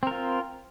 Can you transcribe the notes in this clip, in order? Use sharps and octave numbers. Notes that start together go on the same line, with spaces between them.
C4 F4 A#4